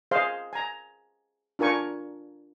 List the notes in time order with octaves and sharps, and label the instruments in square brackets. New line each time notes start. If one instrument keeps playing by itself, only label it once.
[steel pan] G#4 C5 D#5 F5 C6
G#5 A#5
D4 F4 A#4 G#5 C#6